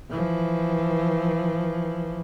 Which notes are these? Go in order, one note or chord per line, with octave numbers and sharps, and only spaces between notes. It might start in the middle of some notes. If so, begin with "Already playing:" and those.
E3 F3